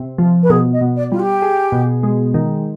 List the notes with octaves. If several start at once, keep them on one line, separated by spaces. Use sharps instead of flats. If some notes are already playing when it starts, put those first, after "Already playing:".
Already playing: C3
F3
B4
B2 G#4
D#5
B2
D5
G3 F4
G4
G#4
B2
G#3
D#3